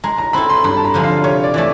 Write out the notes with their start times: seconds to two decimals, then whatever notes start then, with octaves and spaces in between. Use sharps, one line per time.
0.04 G#3 A#5
0.18 A#5
0.33 C4 E4 A4 B5
0.49 C6
0.64 G2 B5
0.77 A5
0.84 A#5
0.94 D3 F3 G#3
1.03 F5
1.24 C3 C#5
1.44 D5
1.54 E3 A3 D5